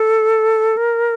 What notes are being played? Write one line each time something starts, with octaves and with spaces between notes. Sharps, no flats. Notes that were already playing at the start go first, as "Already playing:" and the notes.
Already playing: A4
A#4